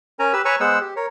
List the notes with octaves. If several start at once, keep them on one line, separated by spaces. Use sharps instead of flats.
C#4 A#4 G#5 A#5
G4 B4 E6
B4 C#5 G#5 A#5 C#6 E6
G#3 B3 C5 F#5 E6
G4
A#4 C#5